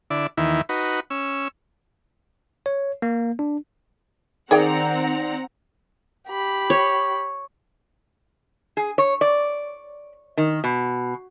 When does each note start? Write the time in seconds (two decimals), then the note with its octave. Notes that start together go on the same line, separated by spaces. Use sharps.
0.10 D3 E4 D5
0.37 D#2 D#3 E3 E4
0.69 D#4 F#4 B4
1.10 C#4 E6
2.66 C#5
3.02 A#3
3.39 D4
4.51 D#3 C4 G#4 D5 F#5 G5 A#5
6.28 G4 B5
6.70 C#5
8.77 G#4
8.98 C#5
9.21 D5
10.37 D#3
10.64 B2